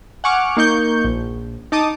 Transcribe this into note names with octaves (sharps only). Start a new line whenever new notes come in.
F#5 G#5 C#6 D6 F6
A#3 D#4 C#6 G6
A#1
D#4 A5 D6 D#6